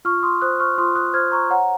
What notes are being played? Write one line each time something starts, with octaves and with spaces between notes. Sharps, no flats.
F4 C#6 F6
C6 D#6
C5 D#6 F#6
C#6 F6
F4 C6 D#6
D#6 F#6
C5 F6 G#6
A#5 C#6
C#5 F#5 A#5